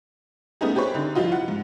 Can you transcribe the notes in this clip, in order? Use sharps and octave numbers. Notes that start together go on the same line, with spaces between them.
G3 A3 B3 C#4 D#4 G#4
C4 G4 G#4 B4 C#5
D3 D#4
F3 G3 E4 F4 D#5
F#5
G#2